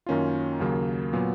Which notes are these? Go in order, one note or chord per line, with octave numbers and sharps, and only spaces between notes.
F#2 D#3 A#3 C#4 F4
D#2 C#3 F#3 A#3
A#2 F#3 B3